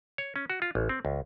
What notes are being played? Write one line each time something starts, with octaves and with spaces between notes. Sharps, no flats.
C#5
C#4
F#4
F4
A1
C4
C#2